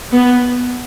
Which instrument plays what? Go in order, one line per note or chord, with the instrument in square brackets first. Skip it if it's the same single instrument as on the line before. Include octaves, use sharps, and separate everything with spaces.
[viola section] B3